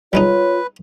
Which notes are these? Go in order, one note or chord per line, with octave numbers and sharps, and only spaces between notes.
G3 G#3 D#4 F4 B4 C#5